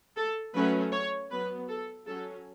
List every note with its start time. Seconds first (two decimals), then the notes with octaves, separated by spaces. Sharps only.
0.16 A4
0.54 F#3 A3 C#4 B4
0.92 C#5
1.30 F#3 B3 B4
1.68 A4
2.07 F#3 C#4 A4